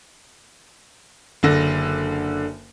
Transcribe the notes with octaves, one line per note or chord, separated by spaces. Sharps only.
F#1 D3 A#6